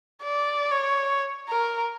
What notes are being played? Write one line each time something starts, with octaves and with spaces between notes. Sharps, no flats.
D5
C#5
A#4